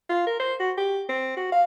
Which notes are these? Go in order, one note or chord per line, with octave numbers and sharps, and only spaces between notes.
F4
A#4
C5
F#4
G4
C4
F#4
F5